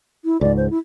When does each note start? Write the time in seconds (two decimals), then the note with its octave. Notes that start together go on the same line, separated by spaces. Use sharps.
0.25 E4
0.41 C#2 G#2 D5
0.57 C5
0.70 E4